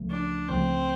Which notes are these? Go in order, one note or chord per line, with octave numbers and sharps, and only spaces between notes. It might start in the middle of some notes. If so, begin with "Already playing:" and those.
Already playing: C#2 C#3 F3 A3
D4
C#2 C#3 F3 A3 C4